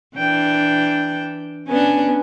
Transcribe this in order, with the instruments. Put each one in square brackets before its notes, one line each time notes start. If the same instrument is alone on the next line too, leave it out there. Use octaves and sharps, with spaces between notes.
[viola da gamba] E3 D4 [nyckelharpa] G5
[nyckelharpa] B3 G#5 [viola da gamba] C#4 D4